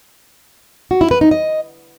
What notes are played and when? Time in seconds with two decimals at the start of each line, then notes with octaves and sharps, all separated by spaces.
0.91 F#4
1.01 E4
1.11 B4
1.21 D#4
1.31 D#5